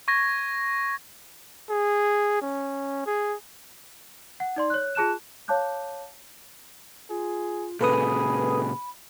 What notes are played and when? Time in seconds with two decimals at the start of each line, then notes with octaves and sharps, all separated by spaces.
0.08 C#6 G#6 A#6
1.70 G#4
2.42 C#4
3.06 G#4
4.40 F#5
4.56 D#4 D5 C6
4.70 C#5 F#6
4.95 F4 G#4 A5 F#6 E7
5.48 C#5 F5 A5 D6 F#6 G6
7.10 F4 G#4
7.81 A#2 C#3 G#4 A4 B4 B5 D#6